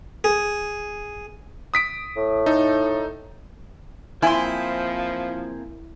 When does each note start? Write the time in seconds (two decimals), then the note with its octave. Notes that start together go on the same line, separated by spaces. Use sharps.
0.24 G#4
1.74 D#6 B6 D7
2.17 A2
2.46 D#4 A4
4.22 F3 A#3 C4 E4 G#4 G#5 C6